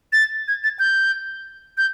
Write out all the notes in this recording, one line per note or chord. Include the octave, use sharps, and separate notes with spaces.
A6
G#6
A6
G6
G6